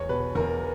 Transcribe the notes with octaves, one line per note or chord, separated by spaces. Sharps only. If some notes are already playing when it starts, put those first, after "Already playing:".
Already playing: E2 C#5
B2 B4
E2 A#4